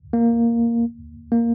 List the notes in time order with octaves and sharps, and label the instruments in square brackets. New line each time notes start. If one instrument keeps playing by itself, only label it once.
[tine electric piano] A#3
A#3